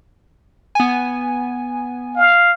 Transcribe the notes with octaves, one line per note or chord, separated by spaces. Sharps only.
B3 G#5
F5